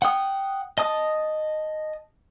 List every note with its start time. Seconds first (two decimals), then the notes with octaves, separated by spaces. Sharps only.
0.02 F#5 G5 D#6
0.78 D#5 A5 D#6